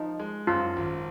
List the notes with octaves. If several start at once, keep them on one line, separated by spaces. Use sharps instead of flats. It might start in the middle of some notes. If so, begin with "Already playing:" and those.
Already playing: F3 D#4
G#3
F#2 F4
G#1